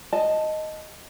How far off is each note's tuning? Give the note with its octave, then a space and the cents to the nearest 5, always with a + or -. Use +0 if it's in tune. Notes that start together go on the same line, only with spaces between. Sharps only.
D#5 +0 A5 +0